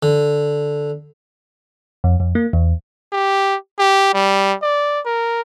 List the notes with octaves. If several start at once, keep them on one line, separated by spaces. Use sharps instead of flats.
D3
F2
F2
A#3
E2
G4
G4
G3
D5
A#4